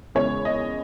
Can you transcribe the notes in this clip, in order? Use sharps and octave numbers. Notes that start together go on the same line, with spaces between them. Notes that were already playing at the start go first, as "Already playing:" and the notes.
E2 C#3 G#3 C#5
D#5